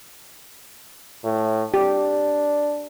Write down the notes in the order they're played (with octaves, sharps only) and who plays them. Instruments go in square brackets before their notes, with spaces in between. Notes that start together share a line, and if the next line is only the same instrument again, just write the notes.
[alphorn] A2
[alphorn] D4 [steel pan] G4